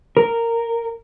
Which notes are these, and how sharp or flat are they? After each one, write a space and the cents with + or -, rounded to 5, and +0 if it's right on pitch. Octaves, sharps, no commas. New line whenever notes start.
A#4 -10